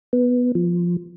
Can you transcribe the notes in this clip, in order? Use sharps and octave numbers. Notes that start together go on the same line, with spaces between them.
B3
F3